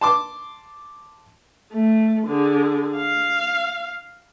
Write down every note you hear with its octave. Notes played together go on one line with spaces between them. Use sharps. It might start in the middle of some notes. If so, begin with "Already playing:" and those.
A5 C6 D6
A3
D3 G#4
F5